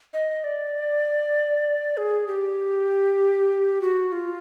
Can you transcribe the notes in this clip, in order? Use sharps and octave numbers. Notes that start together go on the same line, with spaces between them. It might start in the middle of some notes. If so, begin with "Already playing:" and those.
D#5
D5
G#4
G4
F#4
F4